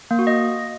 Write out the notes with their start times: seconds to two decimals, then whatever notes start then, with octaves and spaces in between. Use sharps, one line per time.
0.11 A#3
0.19 F#4
0.27 D#5